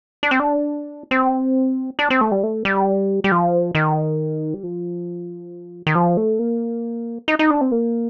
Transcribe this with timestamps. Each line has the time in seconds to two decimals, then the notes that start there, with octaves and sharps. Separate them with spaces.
0.23 D4
0.31 C4
0.40 D4
1.11 C4
1.99 D4
2.10 C4
2.21 A3
2.31 G3
2.43 A3
2.65 G3
3.24 G3
3.32 F3
3.75 D#3
4.54 G3
4.63 F3
5.87 D#3
5.95 F3
6.17 A3
6.39 A#3
7.28 D#4
7.39 D#4
7.50 D4
7.61 C4
7.72 A#3